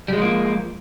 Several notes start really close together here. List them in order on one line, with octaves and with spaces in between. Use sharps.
G3 G#3 F3 A#3